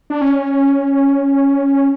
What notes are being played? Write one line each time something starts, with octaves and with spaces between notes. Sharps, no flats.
D4
C#4